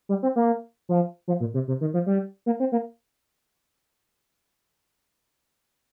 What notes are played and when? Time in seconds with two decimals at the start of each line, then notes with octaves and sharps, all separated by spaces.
0.09 G3
0.23 C4
0.36 A#3
0.89 F3
1.28 F3
1.40 A#2
1.54 C3
1.68 C3
1.81 D#3
1.94 F3
2.06 G3
2.46 A#3
2.60 C4
2.72 A#3